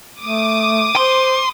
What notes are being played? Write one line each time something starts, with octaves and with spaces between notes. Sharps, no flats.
A3 D6 D#6
C5 C6